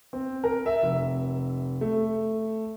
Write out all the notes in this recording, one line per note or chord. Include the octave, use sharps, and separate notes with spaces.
C4
A#4
E5
F1
A3